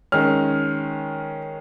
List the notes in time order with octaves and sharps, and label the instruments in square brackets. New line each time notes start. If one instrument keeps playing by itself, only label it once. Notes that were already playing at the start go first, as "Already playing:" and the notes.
[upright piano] D#3 G#3 C#4 F6